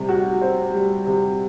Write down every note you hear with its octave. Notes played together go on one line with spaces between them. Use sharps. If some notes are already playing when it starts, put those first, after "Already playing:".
Already playing: C3 G3
F#4
C4
G3
C3